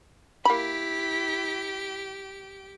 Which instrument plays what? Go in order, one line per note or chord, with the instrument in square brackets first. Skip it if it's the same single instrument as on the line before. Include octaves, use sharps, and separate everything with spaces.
[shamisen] A#3 B5 [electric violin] E4 B6 [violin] G4 D7